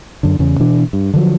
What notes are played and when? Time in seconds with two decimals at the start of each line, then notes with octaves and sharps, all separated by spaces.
0.23 F#2 D3
0.39 E2 C#3
0.60 B2 E3 D4
0.93 G2
1.14 D3 F3 F#3